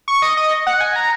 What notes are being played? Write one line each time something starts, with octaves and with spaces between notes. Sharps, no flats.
C#6
D#5
D#5
F#5
G#5
A#5